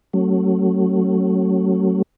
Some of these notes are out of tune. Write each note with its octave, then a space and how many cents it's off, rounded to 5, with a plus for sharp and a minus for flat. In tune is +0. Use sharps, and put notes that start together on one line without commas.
F#3 +25 A3 +25 C#4 -10